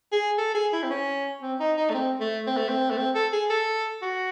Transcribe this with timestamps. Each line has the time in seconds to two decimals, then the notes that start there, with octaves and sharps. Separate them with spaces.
0.12 G#4
0.38 A4
0.54 G#4
0.73 E4
0.83 C4
0.90 C#4
1.42 C4
1.60 D#4
1.77 D#4
1.90 A3
1.94 C4
2.20 A3
2.47 C4
2.57 A3
2.69 C4
2.90 A3
2.97 C4
3.15 A4
3.32 G#4
3.50 A4
4.02 F#4